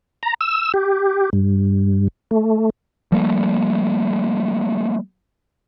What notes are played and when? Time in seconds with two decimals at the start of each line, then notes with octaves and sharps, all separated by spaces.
0.23 A#5
0.41 E6
0.74 G4
1.33 G2
2.31 A3
3.12 F3 G3 A3 A#3